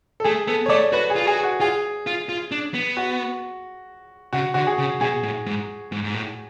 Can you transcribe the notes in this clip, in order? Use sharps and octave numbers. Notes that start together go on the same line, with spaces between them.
A4
A3 G#4
B3 A4
C#5
A3 D5
F#4 B4
G#4
F4
F#4 G#4
F#4
F4 G#4
F4
F4
D4
B3
F#4
C#3 F#4
D3 F#4
G#4
C#3
B2 G#4
A2
G#2
G#2
G#2
A2